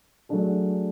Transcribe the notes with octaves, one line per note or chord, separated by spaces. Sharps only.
F#3 A3 D4 G#4